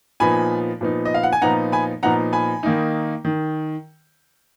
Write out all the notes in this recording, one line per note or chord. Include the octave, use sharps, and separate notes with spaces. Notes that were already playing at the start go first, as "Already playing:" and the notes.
A#2 F3 B3 D#4 G#5 B5
A#2 F3 B3 D#4
D#5
F5
F#5
G#5
A#2 F3 B3 D#4 F#5 A#5
G#5 B5
A#2 F3 B3 D#4 F#5 A#5
G#5 B5
D#3 A#3 D#4
D#3